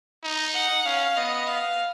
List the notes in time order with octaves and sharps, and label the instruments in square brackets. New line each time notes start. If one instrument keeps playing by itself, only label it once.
[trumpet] D#4
[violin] F#5
[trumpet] C#4 [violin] F5
[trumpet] B3 [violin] D#5
[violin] F5